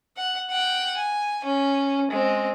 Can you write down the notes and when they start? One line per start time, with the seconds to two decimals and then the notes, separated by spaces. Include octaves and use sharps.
0.17 F#5
0.50 F#5 G5
0.97 G#5
1.45 C#4
2.11 G#3 C4